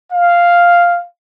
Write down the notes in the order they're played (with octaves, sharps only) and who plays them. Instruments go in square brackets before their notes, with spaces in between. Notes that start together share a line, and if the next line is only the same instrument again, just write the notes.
[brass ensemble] F5